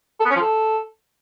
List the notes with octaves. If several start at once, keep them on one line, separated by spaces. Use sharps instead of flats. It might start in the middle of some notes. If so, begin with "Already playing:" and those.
A4
B3
C#4
F3
A4